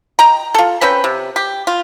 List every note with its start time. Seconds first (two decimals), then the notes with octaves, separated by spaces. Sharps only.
0.19 D#5 G5 A#5
0.54 F4 A4
0.81 C4 C#4 B4 G5
1.04 C3
1.36 G4
1.67 F4